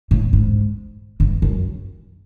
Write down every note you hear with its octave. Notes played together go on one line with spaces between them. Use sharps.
A2
G#2
G2
F#2